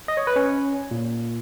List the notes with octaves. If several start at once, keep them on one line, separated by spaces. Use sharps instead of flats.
D#5
C#5
B4
C#4 C#5
A#2